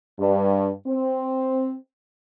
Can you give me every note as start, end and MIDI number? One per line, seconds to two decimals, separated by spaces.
0.20 0.70 43
0.86 1.76 60